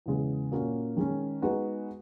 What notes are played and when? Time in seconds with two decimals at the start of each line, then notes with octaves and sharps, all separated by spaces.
0.06 E2 C#3 G#3 B3
0.51 A#2 A#3 C#4 F#4
0.97 D#3 G#3 C#4
1.42 G#3 B3 D#4 F#4 B4